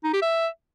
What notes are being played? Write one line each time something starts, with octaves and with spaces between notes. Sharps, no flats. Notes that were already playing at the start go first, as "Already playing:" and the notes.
D#4
G4
E5